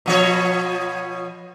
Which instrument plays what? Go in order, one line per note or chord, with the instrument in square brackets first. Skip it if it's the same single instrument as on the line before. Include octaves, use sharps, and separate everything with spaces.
[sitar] B2 F3 C#5